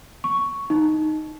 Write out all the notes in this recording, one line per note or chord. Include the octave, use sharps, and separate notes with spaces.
C#6
D#4